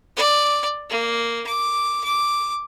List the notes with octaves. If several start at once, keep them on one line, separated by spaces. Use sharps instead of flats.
D5
A#3
D6
D6